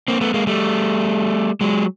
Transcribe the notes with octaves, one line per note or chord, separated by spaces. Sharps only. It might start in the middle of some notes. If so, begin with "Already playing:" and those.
A#3 C4
A3 B3
G#3 A#3
G3 A3
F#3 G#3